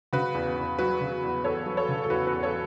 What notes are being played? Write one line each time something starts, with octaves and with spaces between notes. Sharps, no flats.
C#3 F#4 B4
E2
E2
F#3 F#4 B4
C#3
E2
E2 A4 C#5
F#3
A4 C#5
C#3
A4
E2 F#4 B4
F#4 B4
E2
A4 C#5